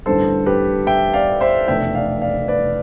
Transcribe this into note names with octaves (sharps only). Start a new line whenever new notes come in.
A1 G2 D3 G3 A4 C5
G4 B4
E5 G5
D5 F5
C5 E5
F1 E2 B2 A3 D4 E5 G5
D5 F5
D5 F5
B4 D5